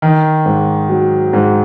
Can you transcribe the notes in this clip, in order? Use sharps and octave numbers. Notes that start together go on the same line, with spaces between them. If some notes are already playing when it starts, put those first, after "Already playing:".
D#3
G#2
F#3
G#2